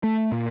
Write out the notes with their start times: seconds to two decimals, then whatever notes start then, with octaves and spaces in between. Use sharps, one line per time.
0.03 A3
0.32 A#2